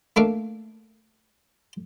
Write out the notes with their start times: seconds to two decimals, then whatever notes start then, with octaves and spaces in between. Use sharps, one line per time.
0.16 A3 A#3 D4 E5 F5